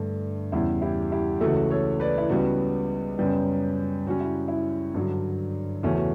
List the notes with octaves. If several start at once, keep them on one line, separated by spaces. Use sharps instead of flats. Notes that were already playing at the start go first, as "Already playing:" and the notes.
Already playing: G2 D3 A3
E2 C#3 G3 E4
E4 G4
E4 G4
C#2 C#3 E3 A3 F#4 A4
A4 C#5
B4 D5
E4
C#2 C#3 G3 B3 F#4
F#2 C#3 G3 B3
F#2 C#3 G3 C#4 F#4
E4
E4
G2 D3 F#3
E2 C#3 E3 A3 C#4 F#4
F#4